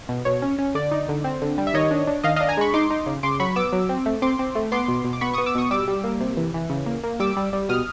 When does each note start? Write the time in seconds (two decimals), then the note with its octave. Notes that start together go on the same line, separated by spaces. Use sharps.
0.09 B2
0.25 B2 C#5
0.42 C#4
0.59 C#4
0.75 D3 D5
0.91 D#4
1.09 D3
1.24 C4
1.42 D3
1.58 G3
1.67 E5
1.74 D#3 C#5 D#5
1.91 D4
2.07 D4
2.24 D#3 D#5 F5
2.36 D4 D#5 F5
2.49 G#5 A#5
2.57 G#3 B5 C#6
2.74 D#4 C6 D6
2.90 D#4
3.06 C#3
3.23 C#3 C6 D6
3.40 F#3 B5 C#6
3.56 B3 D6 E6
3.73 F#3
3.89 C4
4.06 A3
4.22 C4 C6 D6
4.39 C4
4.55 A3
4.72 B3 C6 D6
4.88 B2
5.05 B2
5.13 D6
5.21 B3 B5 C#6
5.33 B3 C#6 D#6
5.46 D6 E6
5.55 B2 C#6 D#6
5.71 G3 D6 E6
5.88 G3
6.04 A#3
6.21 C3
6.37 E3
6.54 E3
6.70 C#3
6.86 A#3
7.04 A#3
7.20 G3 D6 E6
7.36 G3
7.53 G3
7.69 B2 D#6 F6